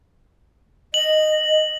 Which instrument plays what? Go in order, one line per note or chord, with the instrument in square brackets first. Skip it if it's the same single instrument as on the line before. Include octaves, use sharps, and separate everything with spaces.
[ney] D#5 [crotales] F#7